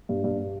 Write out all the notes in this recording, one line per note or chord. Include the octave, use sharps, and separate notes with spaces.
G2
G2